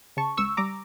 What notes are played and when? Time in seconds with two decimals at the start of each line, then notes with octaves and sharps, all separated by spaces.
0.17 C#3 A5 C#6
0.37 C#2 C#6 E6
0.57 G3 A#5 D6